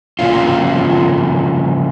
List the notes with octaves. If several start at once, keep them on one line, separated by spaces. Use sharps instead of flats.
C#3 F3 A#3 C#4 F4